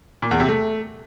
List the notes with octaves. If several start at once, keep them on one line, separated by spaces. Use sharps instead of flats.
A#2
E2
C3
A3